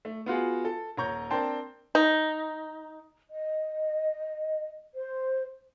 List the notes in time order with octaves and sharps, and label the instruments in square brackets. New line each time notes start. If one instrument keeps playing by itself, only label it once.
[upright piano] A3
B3 F4 F#4 G#4
A4
D#1 C#5 A#5 C#6 G6
C4 D4 A#4 G5 A5 C6
[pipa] D#4
[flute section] D#5
C5